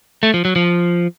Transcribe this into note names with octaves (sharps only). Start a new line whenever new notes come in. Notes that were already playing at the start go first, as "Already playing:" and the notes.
A3
F3
F#3
F3